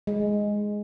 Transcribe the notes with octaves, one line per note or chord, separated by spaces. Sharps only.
G#3